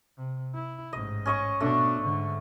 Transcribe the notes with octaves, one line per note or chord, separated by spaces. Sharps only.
C3
E4
A1 G#2 D#5
C#4 D#5 C#6
B2 A3 D4
G#2 D3